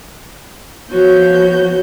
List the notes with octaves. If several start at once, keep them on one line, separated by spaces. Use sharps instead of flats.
F3 B3 F#4 C#5 G6